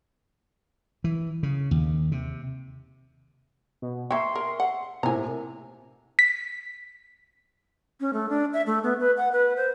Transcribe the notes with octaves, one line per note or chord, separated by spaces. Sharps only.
E3
C#3
D#2
C3
B2
A#3 E5 G5 C6 C#6
A#4
F#5
A2 C3 A#3 G#5 A#5
B6
C#4
A3
D4
E5
A3
B3
B4
F#5
B4
C5